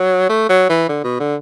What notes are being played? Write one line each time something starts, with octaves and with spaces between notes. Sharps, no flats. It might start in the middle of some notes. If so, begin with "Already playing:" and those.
Already playing: F#3
A3
F#3
E3
D3
B2
D3